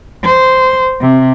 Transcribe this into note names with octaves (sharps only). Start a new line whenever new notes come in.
C5
C3